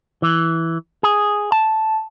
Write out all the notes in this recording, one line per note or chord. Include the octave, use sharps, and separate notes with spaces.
E3
G#4
A5